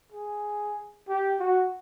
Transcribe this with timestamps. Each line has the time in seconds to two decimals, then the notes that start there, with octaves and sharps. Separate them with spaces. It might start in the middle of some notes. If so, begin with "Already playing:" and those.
0.12 G#4
1.08 G4
1.40 F#4